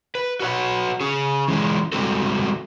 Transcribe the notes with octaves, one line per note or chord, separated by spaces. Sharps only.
B4
F#4 B4 C#5 F#5
C#4 G#4
E3 G#3 C#4
G3 G#3 C4 F#4 A4